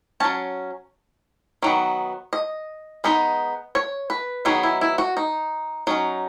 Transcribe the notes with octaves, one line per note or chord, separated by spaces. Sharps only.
F#3 C#4 A5
D#3 F#3 B3
D#5
G#3 B3 D#4
C#5
B4
D#3 F#3 B3 D#4 G#4
E4
E4
F#4
D#4
F#3 C#4 D#4